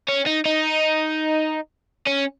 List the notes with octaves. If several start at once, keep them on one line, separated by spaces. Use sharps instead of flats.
C#4
D#4
D#4
C#4